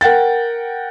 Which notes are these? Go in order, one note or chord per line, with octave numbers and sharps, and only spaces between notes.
A#4 F#5 G5 A6